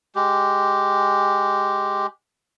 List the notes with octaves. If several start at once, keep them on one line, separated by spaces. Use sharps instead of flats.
G#3 G4